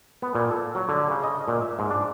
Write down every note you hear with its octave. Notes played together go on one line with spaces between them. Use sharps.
B3
A#2
A4
F#3
D3
C#3
D#5
A#2
E5
G#2
D4